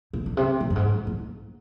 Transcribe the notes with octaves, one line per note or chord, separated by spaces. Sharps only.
A#2
A#2
C3
A#2
G2
G#2
G2
A#2